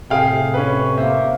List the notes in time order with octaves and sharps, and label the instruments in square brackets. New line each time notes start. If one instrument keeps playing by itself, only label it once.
[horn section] A2 C3 [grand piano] G#4 F5 G5
[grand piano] C#4 B4 [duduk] C#5
[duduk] A#3 [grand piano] C5 E5